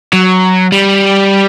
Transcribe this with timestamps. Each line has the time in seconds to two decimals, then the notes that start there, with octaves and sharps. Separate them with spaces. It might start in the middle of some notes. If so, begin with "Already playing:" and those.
0.13 F#3
0.72 G3